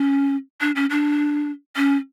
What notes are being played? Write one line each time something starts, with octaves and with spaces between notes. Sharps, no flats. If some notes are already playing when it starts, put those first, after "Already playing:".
Already playing: C#4
D4
C#4
D4
C#4